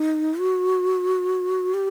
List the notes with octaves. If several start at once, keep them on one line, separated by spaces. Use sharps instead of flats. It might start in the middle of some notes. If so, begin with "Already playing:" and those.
Already playing: D#4
F#4
G4